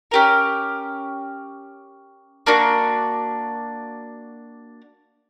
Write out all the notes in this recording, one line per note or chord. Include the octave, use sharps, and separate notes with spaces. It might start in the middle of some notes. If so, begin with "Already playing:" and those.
C#4 G4 A#4
A#3 D4 F#4